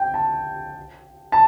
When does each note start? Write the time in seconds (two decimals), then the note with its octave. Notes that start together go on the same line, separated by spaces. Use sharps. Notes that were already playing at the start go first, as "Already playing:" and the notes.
Already playing: G5
0.14 A5
1.32 A5